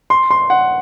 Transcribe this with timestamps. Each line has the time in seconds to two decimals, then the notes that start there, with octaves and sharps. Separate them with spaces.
0.10 C6
0.31 C6
0.50 F#5